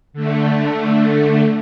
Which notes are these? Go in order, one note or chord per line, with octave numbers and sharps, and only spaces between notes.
D3 A3